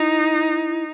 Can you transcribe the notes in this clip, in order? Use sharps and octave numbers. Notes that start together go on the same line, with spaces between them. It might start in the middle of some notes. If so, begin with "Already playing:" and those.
Already playing: D#4 E4